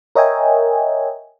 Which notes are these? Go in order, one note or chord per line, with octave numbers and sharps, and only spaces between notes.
A#4 C#5 D#5 E5 G5 G#5